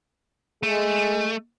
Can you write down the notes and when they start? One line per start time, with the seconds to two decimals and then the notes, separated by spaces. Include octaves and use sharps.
0.63 G#3 A3